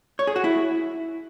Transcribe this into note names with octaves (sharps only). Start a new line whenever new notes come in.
C#5
G#4
F#4
E4